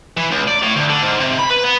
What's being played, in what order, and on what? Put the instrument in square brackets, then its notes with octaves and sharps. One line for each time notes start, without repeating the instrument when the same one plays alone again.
[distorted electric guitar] E3
C#2
D5
A2
D2
D3
G#2
C3
B5
B4
B3